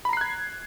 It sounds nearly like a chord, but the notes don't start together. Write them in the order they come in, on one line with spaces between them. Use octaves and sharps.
B5 A#5 C7 F#6 G#6